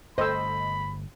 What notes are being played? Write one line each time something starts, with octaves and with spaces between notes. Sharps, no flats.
G1 A3 A4 C5 D#5 B5 E6